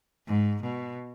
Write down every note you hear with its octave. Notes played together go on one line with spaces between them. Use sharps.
G#2
B2